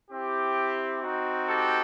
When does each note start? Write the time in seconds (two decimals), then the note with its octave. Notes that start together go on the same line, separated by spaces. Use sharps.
0.10 C4 E4 G4
1.01 C4 D#4 F#4
1.48 G4 A4